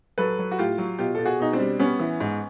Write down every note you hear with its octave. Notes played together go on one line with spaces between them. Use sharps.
F#3 A4 B4
F#3
F#4
A2 F4 G4
F#3
B2 F4 G4
B2 A4
F#4 G#4
B2 D#4
C4 D4
G3
G3 B3 C#4
E3
G#2